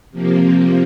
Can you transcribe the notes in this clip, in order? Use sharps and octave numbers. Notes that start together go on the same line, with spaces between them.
C3 F3 A#3